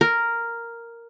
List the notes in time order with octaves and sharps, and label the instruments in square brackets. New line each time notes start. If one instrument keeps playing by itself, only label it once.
[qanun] A#4